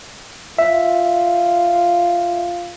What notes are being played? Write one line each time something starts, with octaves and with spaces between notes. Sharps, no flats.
F4 E5